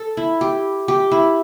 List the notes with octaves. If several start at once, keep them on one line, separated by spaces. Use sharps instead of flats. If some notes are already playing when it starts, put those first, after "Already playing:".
Already playing: A4
E4
G4
G4
E4